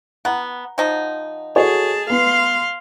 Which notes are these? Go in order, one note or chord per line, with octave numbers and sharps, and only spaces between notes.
B3 F#5 A#5
F3 D#4
F#4 G#4 A4 C#5 A5
B3 B4 F5 C6